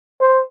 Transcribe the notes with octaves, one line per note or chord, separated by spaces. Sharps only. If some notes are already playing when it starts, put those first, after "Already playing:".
C5